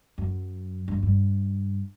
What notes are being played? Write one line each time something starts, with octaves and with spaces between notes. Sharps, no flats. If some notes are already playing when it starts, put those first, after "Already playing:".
F#2
G2
G2